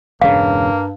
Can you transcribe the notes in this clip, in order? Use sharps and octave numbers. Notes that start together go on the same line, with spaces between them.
E1 G2 C#3 A#3 F5